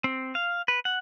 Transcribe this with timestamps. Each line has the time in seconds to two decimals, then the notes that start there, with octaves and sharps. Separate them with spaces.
0.04 C4
0.35 F5
0.68 B4
0.85 F#5